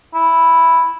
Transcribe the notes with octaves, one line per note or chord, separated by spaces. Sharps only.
E4